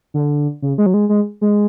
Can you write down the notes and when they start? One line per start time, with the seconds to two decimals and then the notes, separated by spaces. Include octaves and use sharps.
0.14 D3
0.62 C#3
0.78 G#3
0.86 F#3
0.94 G#3
1.09 G#3
1.41 G#3